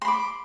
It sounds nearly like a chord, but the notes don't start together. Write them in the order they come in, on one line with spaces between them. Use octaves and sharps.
C6 B5 D6